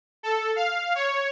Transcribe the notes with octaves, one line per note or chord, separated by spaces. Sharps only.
A4
F5
C#5